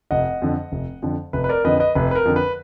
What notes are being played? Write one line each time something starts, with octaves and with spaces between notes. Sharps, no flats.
F1 D#5 F#5
F2 D3
F1
F2 D3
F1 B4
B4
A#4 D5
F2 D3 B4 D#5
B4 D#5
F1 B4
B4
A#4
F2 D3
B4